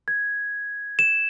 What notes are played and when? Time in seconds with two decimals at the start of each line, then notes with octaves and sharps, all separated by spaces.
0.08 G#6
0.99 E7